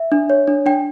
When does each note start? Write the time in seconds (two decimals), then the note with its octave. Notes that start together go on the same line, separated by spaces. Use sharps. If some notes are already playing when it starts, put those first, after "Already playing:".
Already playing: E5
0.12 D4
0.30 C#5
0.48 D4
0.66 D4 G5